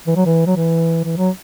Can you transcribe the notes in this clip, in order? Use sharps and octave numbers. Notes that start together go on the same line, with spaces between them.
E3
F#3
E3
F#3
E3
E3
F#3